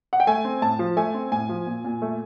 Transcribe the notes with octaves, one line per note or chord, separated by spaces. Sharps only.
F#5
G5
A3 G#5
C4
A2 A5
F3
A3 G#5
C4
A2 G#5
F3
A#2
A#2
A3